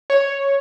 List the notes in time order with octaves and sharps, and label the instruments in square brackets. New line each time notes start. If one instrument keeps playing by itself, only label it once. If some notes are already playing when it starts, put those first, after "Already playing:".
[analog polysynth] C#5